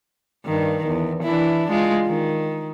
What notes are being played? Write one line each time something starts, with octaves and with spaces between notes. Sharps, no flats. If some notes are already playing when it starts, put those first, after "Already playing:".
G2 D#3
E2
E3 D4 E4
G#3 F4
D#3